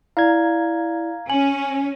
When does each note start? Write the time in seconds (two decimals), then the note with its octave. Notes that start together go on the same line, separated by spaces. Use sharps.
0.17 E4 D5 F5 A#5 G#6
1.30 C#4 G#5 F#7